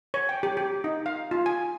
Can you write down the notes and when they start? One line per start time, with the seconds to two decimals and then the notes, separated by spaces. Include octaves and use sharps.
0.14 C#5
0.29 G5
0.43 G4
0.57 G4
0.84 D#4
1.06 F5
1.31 F4
1.46 G#5